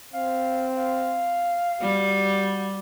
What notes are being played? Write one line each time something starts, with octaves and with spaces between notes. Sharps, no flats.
C4 F5
F5
G3 F#4